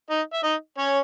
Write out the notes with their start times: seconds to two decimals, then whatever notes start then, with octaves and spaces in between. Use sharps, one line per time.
0.10 D#4 D#5
0.34 E5
0.44 D#4 D#5
0.78 C#4 C#5